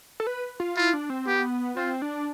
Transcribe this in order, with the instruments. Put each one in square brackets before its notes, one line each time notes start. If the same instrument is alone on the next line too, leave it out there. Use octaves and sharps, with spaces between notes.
[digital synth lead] A4
B4
F4
[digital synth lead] E4 [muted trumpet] F4
[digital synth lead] D4
C4
[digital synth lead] B3 [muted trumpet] G4
[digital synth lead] C4 [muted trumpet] F4
[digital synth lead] D4